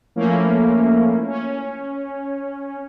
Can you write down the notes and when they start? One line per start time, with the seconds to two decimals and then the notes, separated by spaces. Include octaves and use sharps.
0.16 F3 A3 A#3 C#4 E4
1.27 C#4